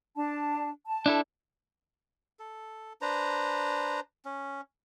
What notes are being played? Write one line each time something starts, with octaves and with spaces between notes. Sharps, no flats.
D4 A5
A5
D4 E4 A4
A4
D4 B4 C5 A#5
C#4